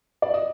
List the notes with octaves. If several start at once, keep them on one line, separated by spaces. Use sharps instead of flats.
D5
D#5